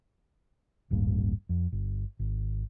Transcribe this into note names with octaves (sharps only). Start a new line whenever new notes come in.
D#1 A1 G2 A#3
F2
G1
G#1